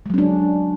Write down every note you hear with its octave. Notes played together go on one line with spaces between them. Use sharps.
F#3 G#3 C#4 D4